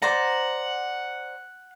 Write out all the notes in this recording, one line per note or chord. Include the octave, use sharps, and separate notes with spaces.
C5 D5 F#5 A#5